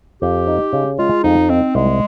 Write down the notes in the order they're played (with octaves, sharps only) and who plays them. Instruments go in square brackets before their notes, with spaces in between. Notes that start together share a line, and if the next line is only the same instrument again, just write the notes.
[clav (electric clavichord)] F2 [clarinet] G4
[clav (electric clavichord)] D#4
C#3
[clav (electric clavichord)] G#3 [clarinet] F4
[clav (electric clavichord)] F2 [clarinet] D#4
[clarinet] C4 [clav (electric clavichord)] D#4
[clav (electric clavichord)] C2 [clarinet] G#3